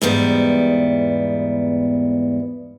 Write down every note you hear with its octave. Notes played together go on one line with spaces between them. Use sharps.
E2 G#2 G3 B3